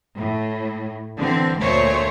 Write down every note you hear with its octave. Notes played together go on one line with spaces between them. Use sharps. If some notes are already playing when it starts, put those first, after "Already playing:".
A2
D3 E3 C4
D2 A#2 A3 C5 C#5